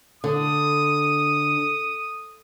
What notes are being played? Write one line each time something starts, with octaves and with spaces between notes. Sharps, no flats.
D3 D#6